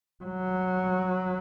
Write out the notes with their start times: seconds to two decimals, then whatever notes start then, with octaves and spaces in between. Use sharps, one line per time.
0.24 F#3